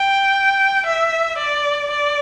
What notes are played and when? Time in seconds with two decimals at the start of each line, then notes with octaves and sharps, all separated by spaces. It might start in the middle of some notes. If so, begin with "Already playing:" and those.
Already playing: G5
0.86 E5
1.38 D5
1.91 D5